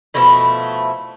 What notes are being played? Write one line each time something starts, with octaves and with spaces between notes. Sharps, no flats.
B2 F3 A3 E4